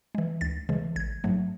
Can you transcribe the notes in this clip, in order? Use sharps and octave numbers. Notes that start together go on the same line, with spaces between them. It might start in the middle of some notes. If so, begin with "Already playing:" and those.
E3 G#3
D2 A6
C#3 E3 G#3
A1 G#6
G#2 F#3 A3